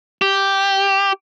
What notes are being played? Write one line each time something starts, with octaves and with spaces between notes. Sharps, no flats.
G4